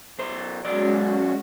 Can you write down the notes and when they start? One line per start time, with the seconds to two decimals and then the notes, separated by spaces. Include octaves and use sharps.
0.18 B1 C5
0.64 B1 F#3 G#3 C#4 F#4 D5